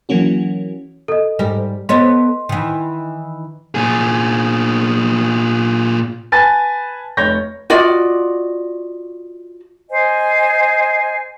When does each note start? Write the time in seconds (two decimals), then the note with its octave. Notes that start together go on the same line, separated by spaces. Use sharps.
0.09 E3 F#3 A#3 C#4 F#4
1.08 A4 D#5
1.39 G#2 G3 A#4
1.89 B3 A4 C#5 D#5 C6
2.49 D#3 E3
3.75 A#2 G#4
6.32 B4 G#5 A5 B5 A6
7.17 F1 C#5 G6 A#6
7.70 F4 F#4 D5 D#5
9.89 C5 D#5 G#5